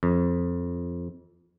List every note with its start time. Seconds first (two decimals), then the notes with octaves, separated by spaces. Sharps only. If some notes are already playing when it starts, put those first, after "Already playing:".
0.03 F2